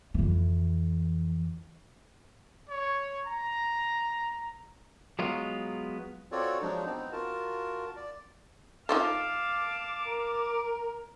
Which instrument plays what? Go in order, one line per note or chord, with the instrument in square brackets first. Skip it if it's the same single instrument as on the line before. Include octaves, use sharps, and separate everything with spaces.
[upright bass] F2 E3
[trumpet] C#5
A#5
[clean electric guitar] F#3 G#3 B3 F4
[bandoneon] C4 F4 F#4 A4 C#5 D5
F3 F#3 G#3 D4 D#4
B3 C4 D#4
F4 F#4 A#4 A5
D5
[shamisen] D#4 F4 A4 [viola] F5 A5 [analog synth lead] D6
[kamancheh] A#4